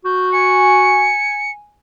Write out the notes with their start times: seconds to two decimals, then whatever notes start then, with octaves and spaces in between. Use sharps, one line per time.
0.05 F#4 G6
0.32 G#5 C#7